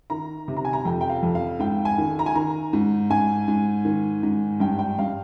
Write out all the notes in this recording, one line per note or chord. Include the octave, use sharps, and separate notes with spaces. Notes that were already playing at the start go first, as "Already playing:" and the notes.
D#3 A#5
C3
A#5
G#5
A#5
F2 G5
G5
F5
F2
F5
G#2 G5
G#5
D#3
A#5
G#5
D#3 A#5
G#2
G#2 G#5
G#2
D#3
G#2
G2 G5
G5
G2 F5